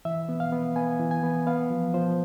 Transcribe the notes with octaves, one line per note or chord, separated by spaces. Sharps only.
E3 E5
B3
F5
B3
B3 G#5
E3
G#5
B3
B3 F5
F3
F3 C5